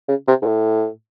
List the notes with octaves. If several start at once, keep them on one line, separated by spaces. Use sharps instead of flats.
C#3
C3
G#2
A2